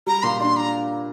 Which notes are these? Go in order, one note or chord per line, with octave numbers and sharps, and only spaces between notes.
G3 A#5
A#2 C6
D4 C6
A#5